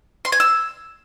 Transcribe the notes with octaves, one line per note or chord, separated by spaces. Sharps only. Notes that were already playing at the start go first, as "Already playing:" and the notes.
C6
G#5
E6